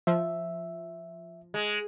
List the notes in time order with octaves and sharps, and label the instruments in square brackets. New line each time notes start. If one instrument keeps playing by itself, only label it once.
[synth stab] F3 [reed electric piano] E5
[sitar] G#3